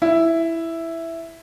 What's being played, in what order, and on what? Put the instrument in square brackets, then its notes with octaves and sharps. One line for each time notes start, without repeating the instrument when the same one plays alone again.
[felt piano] E4